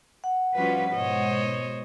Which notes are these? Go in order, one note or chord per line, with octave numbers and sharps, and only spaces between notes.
F#5
F3 G3 C#4 F4 F#4 B4
G#2 B2 C5 C#5 D#5